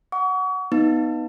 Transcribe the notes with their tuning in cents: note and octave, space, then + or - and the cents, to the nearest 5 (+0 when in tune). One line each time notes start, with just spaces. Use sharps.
F#5 +0 C#6 +40
B3 +0 D#4 +5